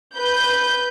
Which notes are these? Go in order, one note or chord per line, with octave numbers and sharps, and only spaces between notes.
B4 G6